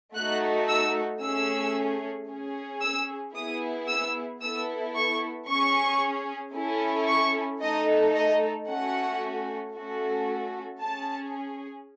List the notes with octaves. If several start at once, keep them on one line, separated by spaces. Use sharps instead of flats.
A3 D#4 F#4 A4 F#6
E6
A3 C#4 G#4 E6
C#4 G#4
E6
B3 E4 G#4 D#6
E6
B3 E4 A4 E6
C#6
C#4 G#4 C#6
C#4 E4 A4
C#6
A3 D#4 A4 D#5
D#5
A3 C#4 F#4 F#5
A3 C#4 F#4 A4
C#4 G#4 A5